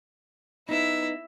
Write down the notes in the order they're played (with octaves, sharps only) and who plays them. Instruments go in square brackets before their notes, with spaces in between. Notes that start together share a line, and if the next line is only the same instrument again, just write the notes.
[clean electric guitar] B3 D#4 [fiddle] E4 E5